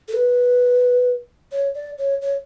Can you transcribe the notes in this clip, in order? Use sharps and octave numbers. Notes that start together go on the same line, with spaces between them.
A4
B4
C#5
D5
C#5
C#5